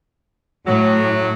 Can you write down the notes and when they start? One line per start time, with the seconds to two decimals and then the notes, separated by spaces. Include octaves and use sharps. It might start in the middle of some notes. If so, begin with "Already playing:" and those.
0.67 A2 F#3